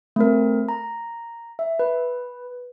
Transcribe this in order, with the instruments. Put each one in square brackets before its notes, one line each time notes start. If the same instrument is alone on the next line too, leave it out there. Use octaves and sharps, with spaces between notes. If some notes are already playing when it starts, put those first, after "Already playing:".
[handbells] A3 C4 A#4
A#5
E5
B4